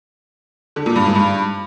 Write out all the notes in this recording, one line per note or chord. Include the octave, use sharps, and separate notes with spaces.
D3
A#2
G2
G#2
G2